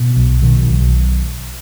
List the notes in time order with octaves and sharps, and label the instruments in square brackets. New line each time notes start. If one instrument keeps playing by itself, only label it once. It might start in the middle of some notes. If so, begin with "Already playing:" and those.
Already playing: [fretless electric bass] B2
B1
B2 D#3
D#3
B1